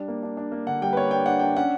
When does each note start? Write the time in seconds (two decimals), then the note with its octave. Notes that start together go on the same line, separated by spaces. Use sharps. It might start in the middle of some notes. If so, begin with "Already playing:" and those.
Already playing: G3 D4
0.08 A#3
0.23 D4
0.37 D4
0.52 A#3
0.66 D3 F#5
0.82 G3 G5
0.93 B4
0.97 A#3 C#5
1.11 D4 G5
1.26 D4 F#5
1.39 D4 G5
1.57 C#4 F#5